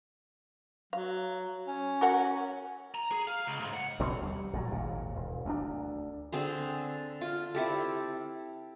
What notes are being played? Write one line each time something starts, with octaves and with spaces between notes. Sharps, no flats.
F#3 F5
C#4
F#4 A#4 F#5
A#5
G#4
F5
C#2
G#2
F#5
D#2 B2 D3 F#3
G3
A#1 G#2 C3 F#3
G#1 D#2 A#2
E1
D2 A#3 D4
D3 C4 G#4 C5
F4
C4 E4 G4 A4